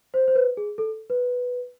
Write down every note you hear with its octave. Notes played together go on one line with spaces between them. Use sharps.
C5
C5
B4
G#4
A4
B4